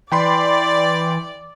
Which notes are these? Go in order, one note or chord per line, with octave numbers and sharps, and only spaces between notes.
E3 D5 G5 B5 C6